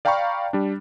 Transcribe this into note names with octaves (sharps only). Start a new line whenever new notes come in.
D5 F5 G5 A#5 B5 C#6
G3 D4